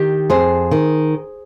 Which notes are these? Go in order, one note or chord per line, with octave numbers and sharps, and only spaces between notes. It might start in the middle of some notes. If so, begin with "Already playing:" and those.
Already playing: D#3 G4
F2 G#4 C5
D#3